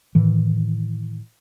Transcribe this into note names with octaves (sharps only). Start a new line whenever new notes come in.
A2 D#3 E3